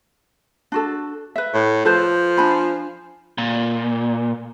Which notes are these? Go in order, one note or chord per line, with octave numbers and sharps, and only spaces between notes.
D4 F#4 A4
B4 E5
A2
F3 A4 B4 C5
D4 G#5 B5
A#2